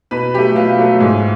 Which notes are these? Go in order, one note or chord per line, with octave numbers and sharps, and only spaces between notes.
B2 B4
F#3 A3 G4
B2 F4
F#3 A3
G#2